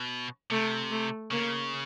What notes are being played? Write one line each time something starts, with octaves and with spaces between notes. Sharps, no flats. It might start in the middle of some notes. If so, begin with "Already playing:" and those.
Already playing: B2
C3 A3
A3
C#3 A#3